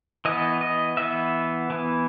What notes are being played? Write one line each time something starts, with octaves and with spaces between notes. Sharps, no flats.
E3 B3 D#5
D#5
E3 B3 E5
E3 B3